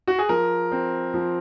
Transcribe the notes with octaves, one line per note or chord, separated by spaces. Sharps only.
F#4
G#4
F3 A#4
C4
F3